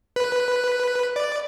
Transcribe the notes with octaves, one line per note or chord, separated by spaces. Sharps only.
B4
D5